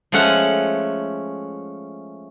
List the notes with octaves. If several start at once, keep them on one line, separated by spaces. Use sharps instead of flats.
F3 G#3 A3 C#4 F#5